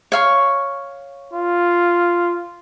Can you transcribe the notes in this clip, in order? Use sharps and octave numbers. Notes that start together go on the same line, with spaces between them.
C#5 F5 C#6
F4